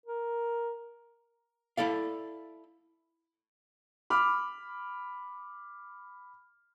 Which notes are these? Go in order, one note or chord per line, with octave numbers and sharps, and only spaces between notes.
A#4
E4 A4 D5 F5
B5 D6 F6